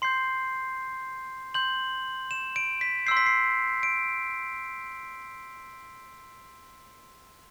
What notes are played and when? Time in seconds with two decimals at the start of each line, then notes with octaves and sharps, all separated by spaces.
0.02 C6 G6 C7
1.54 C6 G6 F#7
2.31 E7
2.56 D7
2.81 B6
3.06 C6 E6 G6 C7
3.17 B6
3.26 C7
3.83 D7